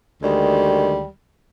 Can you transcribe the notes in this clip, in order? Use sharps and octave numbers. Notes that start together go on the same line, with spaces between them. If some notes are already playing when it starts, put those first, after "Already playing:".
D2 D#3 G3 G#3